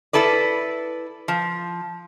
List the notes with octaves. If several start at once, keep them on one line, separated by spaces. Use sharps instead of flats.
E4 A4 B4 D5
F3